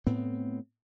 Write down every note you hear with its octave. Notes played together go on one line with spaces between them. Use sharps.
A2 B3 C4